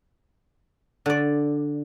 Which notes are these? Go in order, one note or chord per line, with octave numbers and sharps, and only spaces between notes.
D3 D5